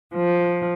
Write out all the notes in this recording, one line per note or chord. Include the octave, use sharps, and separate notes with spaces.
F3